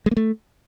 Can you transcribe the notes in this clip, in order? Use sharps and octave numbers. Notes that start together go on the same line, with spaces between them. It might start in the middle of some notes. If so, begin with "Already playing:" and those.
G#3
A#3
A3